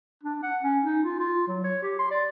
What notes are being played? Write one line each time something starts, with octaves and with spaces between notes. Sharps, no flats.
D4
F#5
C#4
D#4
F4
F4
F#3
C#5
G4
C6
D5